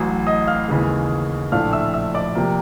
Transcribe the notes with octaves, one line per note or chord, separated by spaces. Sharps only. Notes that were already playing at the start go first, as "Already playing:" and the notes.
Already playing: A1 A2 F#3
D#5 D#6
F5 F6
D#2 C#3 E3 G#3
A#1 A2 F3 A3 D4 F5 F6
E5 E6
E5 E6
D5 D6
C3 F3 A#3